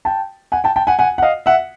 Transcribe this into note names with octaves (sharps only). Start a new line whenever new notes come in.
G5 A5
F#5 G#5
G5 A5
G5 A5
F#5 G#5
F#5 G#5
F#5
D#5 F5
E5 F#5